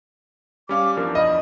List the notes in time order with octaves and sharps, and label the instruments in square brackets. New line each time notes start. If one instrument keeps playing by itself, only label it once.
[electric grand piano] G3 C#4 F5 [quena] D6
[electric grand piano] E2 F3 D4 [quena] A#4
[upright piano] D#5 [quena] B5